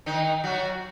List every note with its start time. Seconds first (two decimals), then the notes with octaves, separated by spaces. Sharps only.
0.06 D#3 D#4
0.44 F#3 F#4